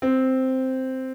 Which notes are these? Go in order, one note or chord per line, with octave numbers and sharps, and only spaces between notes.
C4